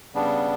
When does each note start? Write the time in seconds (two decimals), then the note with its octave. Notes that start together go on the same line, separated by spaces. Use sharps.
0.14 C#3 G3 B3 D4